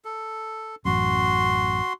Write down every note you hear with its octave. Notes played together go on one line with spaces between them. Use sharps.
A4
A1 F#2 F#4 C6